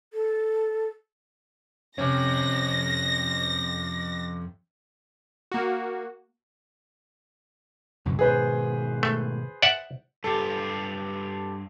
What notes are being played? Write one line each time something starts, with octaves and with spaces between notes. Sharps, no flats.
A4
F2 C3 C4 C#4 A#6
A#3 F#4
C#2 F#2 B2
G#2 B2 D#3 G#4 B4 C5
A3
D5 E5 F#5
G2 F4 G4 A4